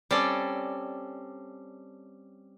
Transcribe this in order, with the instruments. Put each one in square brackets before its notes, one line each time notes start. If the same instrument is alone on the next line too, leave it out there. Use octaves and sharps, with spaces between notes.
[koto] G3 C4 C#4 A4 D5